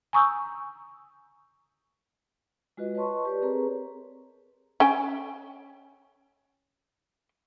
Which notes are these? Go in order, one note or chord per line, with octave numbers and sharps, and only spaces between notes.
G#5 A#5 C#6 D#6 E6 G6
G#3 F4 F#4 B4 D#5
B4 C#5 D#5 A5 C6 C#6
G4 B4 D5
C4 G#4 A#4 B4 C#5 A#5
C#4 G5